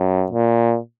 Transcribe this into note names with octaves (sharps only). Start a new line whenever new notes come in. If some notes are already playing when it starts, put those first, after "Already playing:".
Already playing: F#2
A#2